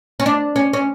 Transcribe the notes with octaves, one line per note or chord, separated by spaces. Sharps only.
C#4
D4
C#4
C#4